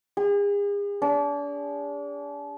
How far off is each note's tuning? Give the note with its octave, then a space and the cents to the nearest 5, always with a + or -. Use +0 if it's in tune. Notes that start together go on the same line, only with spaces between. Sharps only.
G#4 -40
D4 -35